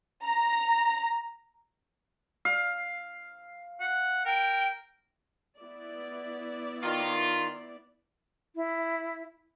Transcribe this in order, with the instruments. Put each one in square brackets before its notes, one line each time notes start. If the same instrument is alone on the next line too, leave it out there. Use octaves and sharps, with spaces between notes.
[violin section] A#5
[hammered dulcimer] F5
[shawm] F#5
[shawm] A#4 [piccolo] G5
[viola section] B3 E4 D5
[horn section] D#3 F4
[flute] E4